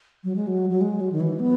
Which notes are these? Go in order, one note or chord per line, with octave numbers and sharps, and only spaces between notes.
F#3
G#3
F#3
F#3
G#3
F#3
D#3
E3
B3